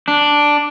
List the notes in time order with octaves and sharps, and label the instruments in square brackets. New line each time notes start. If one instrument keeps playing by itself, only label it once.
[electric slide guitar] D4